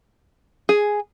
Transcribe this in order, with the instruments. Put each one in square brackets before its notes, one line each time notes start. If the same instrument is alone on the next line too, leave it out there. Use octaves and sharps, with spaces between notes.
[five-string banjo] G#4